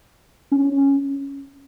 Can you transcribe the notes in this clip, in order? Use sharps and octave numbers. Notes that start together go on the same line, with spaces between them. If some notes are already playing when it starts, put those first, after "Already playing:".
C#4